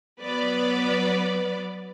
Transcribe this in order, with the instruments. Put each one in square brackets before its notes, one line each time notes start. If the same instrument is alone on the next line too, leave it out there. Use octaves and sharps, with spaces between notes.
[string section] F#3 B3 B4 D5